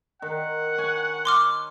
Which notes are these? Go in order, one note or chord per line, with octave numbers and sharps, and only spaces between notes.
D#3 F#5
C#5 G#5
C6 D6 F6